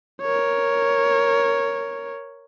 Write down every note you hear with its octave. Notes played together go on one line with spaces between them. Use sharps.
A#4 C#5